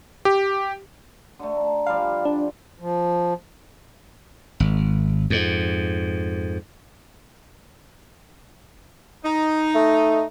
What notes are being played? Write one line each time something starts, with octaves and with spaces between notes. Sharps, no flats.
G4
D3 A3
A5 A#5
F3 G3 D5 F5
D4
F3
G#1
F2 G#2
D#4
A3